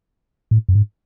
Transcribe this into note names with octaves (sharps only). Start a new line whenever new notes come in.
A2
F#2
G#2